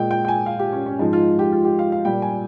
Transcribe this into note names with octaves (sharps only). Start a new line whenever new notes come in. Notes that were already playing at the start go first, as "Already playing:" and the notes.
Already playing: A#2 G#3 G5
G5
G5
G#5
F5
G4
C#4
C#4
G#2 F3 G#3 D#4
F4
G4
F4
G4
F5
F5
A#2 G3 G5
G#5